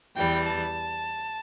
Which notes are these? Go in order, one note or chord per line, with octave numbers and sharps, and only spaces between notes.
E2 E3 G3 G5
A5